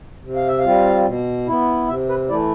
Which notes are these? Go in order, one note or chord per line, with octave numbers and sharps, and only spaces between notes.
C3
F5
E5
F5
G3 C4 F4
B2
B3 E4
C3 E5
B4
E3 A3 E4 D5